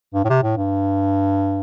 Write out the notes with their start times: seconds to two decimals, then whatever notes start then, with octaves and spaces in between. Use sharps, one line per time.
0.14 G2
0.24 A2
0.29 C3
0.43 A2
0.57 G2